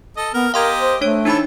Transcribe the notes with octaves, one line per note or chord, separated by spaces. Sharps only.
A4 D#5
B3 A#4
G4 A#4 D#5 F5 C6 G#6
C5
A3 D4 C#5 D7
E3 D4 D#4 A4 B5